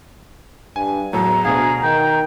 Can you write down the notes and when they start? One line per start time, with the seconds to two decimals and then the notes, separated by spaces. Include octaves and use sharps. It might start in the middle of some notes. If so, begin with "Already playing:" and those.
0.76 G2 G#5
1.13 E2 A2 F#3 A4 A#5
1.45 D2 B2 G#4 F5
1.83 D#3 G5